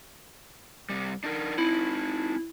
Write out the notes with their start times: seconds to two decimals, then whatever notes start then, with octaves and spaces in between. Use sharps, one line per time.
0.89 C3 G3
1.24 D4 D#4 A#4
1.58 C4 D#4 E4